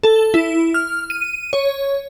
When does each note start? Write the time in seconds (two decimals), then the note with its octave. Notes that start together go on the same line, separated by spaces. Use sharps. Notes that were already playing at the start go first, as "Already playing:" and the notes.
0.03 A4
0.34 E4
0.74 F6
1.10 D#7
1.53 C#5